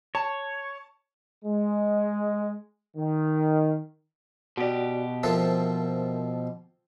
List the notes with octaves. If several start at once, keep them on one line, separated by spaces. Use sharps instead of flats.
C#5 A5
G#3
D#3
B2 F#4 G4 D5
F3 C4 A4 A#4 E5